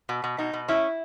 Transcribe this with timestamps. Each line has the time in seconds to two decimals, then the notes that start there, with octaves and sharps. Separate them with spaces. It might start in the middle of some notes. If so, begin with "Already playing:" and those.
0.09 B2
0.24 B2
0.38 B2 D#4
0.53 B2
0.68 C#4 E4